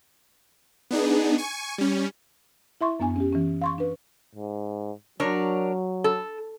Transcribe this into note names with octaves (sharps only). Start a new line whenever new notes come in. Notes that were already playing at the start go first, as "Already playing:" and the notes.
B3 D4 D#4 G#4
G#5 C#6
G3 C#4
E4 E5 C6 C#6
F#2 B3 D4 G#5
C#4 G4
E3 C#4
F5 C6 C#6
D4 B4
G#2
F#3 D4 A#4 C#5
A4